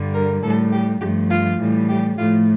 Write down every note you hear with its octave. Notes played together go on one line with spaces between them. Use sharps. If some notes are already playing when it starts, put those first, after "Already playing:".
Already playing: G2 D3 G3
A#4
A2 G3 A4
G4
G2 F3 A3 G4
F4
A2 E3 G3
G4
A2 F3 A3 F4